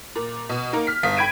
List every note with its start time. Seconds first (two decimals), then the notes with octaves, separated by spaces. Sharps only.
0.16 A#2
0.49 B2
0.73 A#3 D#4 A#4
0.87 F6 B6
1.03 G1 F5 D#6 B6
1.17 G5 B5 G#6 D7 D#7